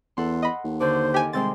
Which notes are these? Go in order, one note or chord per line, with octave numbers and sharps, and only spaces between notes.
E2 A4 F#5 C6
D#5 B5
D#2
D3 F#4 C5 D6
D#3 G4 G#5
C3 G3 G#3 C4 C6 A6